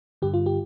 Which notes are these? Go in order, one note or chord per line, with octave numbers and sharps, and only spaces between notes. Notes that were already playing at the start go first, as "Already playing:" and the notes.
G2 D3 G4
F4
G4